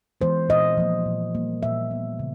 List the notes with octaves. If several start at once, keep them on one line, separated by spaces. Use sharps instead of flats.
E3 G#3 B3 C5
A#2 D#5
F3 A#3
A#2
G3 A#3
A#2 E5
G3 B3
C#3